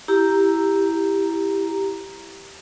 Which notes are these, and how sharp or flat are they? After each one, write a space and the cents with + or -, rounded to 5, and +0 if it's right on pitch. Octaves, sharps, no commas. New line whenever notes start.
E4 +0 G4 +0 A#5 +0